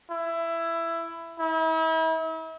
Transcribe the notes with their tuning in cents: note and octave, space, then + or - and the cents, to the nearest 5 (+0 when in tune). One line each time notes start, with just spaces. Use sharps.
E4 +15
E4 -40